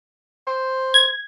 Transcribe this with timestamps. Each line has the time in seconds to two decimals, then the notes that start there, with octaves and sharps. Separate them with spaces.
0.47 C5
0.94 G#6